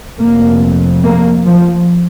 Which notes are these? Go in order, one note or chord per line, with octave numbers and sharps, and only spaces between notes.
F1 F2 A#3
A#3
F3